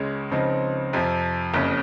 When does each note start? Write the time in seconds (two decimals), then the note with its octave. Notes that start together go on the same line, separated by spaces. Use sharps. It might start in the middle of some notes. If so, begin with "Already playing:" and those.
Already playing: C#2 C#3 G#3 C#4
0.31 C#2 C#3 F3 C4 D#4
0.93 F2 C3 F3
1.54 F#1 F2 C#3